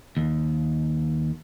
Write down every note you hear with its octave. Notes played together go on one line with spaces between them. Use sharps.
D#2